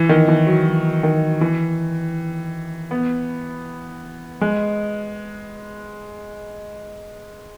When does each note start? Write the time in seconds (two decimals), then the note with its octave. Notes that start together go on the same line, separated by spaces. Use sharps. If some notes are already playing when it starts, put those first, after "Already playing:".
Already playing: E3
0.09 D#3
0.28 E3
0.47 F#3
0.66 F#3
1.03 D#3
1.41 E3
2.91 B3
4.41 G#3